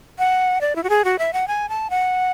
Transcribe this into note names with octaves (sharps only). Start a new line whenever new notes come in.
F#5
D5
E4
F#4
G#4
F#4
E5
F#5
G#5
A5
F#5